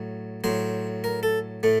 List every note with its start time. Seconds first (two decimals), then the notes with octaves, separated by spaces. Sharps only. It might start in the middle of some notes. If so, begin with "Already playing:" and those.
Already playing: A2 F#3
0.44 A2 F#3 C5
1.04 A#4
1.23 A4
1.63 A2 A3